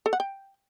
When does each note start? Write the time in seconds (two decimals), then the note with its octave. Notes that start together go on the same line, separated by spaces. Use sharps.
0.06 A4
0.13 F#5
0.20 G5